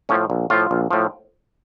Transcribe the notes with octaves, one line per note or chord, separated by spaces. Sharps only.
A2 F3 C#4
A#1
A2 F3 F4
A#1
A2 F3